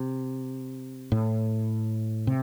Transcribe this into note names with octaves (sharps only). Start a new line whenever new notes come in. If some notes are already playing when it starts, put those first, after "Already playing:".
Already playing: C3
A2
C3